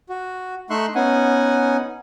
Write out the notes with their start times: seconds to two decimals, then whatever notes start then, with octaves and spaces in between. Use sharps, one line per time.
0.09 F#4
0.70 A3 D#4 E5 C6 C#6 F#6
0.95 B3 C#4 D#4 F#5 G#5